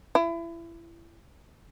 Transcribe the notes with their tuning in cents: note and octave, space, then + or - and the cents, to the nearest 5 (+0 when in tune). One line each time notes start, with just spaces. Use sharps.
E4 +30